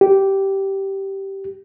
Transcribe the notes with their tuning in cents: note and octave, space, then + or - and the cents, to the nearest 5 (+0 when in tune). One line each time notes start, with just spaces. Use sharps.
G4 -10